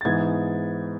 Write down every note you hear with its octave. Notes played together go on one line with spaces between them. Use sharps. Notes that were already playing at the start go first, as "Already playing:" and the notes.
A6
G#2 E3 B3 G#6